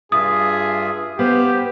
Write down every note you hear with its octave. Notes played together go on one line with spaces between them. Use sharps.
G2 F4 G#4 E5 D#6
B3 G4 C5 F5